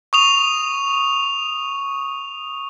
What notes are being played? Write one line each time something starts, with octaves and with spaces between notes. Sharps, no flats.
C#6 D#6 F7